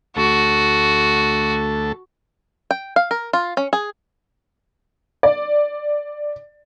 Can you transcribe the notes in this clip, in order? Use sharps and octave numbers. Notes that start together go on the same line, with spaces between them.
D2 A3 F#4 A4
G5
F5
A#4
F4
C#4
G#4
D5